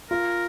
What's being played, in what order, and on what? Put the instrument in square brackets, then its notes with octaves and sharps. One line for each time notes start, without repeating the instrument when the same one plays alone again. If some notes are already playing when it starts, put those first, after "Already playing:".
[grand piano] F4 [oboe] A#4